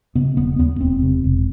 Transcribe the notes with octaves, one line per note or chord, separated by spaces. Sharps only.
C#3 B3
E1 B3
D#2 B3
E1 C4
C3
E1